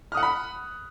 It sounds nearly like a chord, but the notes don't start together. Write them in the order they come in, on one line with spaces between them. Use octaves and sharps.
F6 D#6 F#5 F#6 B5